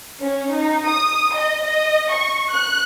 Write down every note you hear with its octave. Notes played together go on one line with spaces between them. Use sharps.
C#4
D#4
D#6
D#5
D#5
C#6
F#6